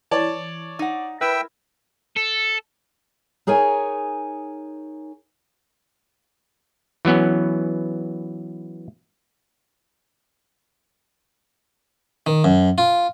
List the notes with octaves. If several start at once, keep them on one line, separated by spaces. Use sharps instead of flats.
E3 C#5 D5 A5
D#4 F#5
E4 A#4 B4 E5 G5 E6
A4
D#4 G#4 A#4 C#5 G#5
E3 F#3 B3 C#4
D#3
F#2
F4